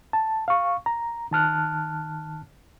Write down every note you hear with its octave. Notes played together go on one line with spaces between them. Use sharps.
A5
F5 C#6
A#5
D#3 A5 F6 F#6